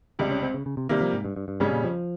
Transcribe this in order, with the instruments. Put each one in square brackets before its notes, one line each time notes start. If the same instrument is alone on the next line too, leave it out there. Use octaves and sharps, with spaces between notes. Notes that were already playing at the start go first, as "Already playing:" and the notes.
[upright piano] C#2 C3 G3
[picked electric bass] C#4
C4
C#3
C#3
C3
[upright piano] C3 G3 A#3 [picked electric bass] D#3
[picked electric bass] F3
G#2
G2
G2
G2
[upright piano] F2 C#3 G3 C#4 [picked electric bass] G#2
[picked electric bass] A#2
F3